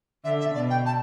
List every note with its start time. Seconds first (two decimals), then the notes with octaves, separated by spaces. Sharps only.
0.24 D3 E5
0.40 E5
0.55 B2 D5
0.70 G5
0.86 A5